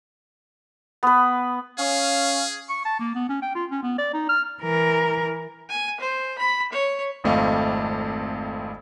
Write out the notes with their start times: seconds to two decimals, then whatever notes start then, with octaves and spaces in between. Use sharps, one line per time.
1.03 B3 B4
1.78 C#4 G#4 F5
2.70 C#6
2.85 A5
3.00 A#3
3.15 B3
3.29 C#4
3.42 G5
3.55 F4
3.71 C#4
3.83 B3
3.98 D5
4.14 D#4
4.29 F6
4.62 E3 A#4
5.69 G#5
6.00 C5
6.38 B5
6.72 C#5
7.24 G#1 F2 A3 C4 D#5 F5